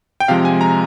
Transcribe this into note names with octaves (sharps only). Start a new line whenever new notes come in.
G5
C3 F3 G#3 F5
G#5
A#5